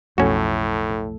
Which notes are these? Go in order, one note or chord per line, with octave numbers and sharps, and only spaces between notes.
B1 F2 A2 A3 C#4 F#4 A4